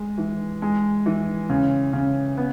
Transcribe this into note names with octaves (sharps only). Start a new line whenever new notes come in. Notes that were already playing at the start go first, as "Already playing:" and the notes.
Already playing: G#3
E3
G#3
E3
C#3
C#3
B3